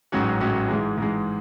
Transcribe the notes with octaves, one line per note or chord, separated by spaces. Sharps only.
A1 G#2 F#3 C#4 F#4
A1 G#2 F#3 C#4 F#4
G#2 E3 G#3
G#2 E3 G#3